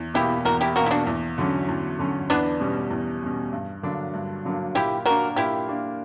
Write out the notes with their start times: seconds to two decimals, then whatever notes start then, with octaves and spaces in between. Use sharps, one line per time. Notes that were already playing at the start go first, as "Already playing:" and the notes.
Already playing: E2
0.14 B2 A#3 E4 G4
0.45 E2 F#4 A#4
0.61 E4 G4
0.75 B2 A#3 F#4 A#4
0.86 E4
0.91 D4 F#4
1.07 E2
1.38 D3 F#3 C#4
1.69 E2
1.99 D3 F#3 C#4
2.30 E2 B3 D4
2.60 B2 G3 C#4
2.91 E2
3.22 B2 G3 C#4
3.53 G2
3.83 D3 F#3 A#3 D4
4.14 G2
4.45 D3 F#3 A#3 D4
4.75 A#2 E4 G4
5.06 A#3 D4 F#4 A#4
5.36 A#2 E4 G4
5.68 A#3 D4